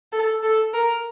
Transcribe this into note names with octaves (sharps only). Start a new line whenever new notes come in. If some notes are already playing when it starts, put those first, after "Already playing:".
A4
A4
A#4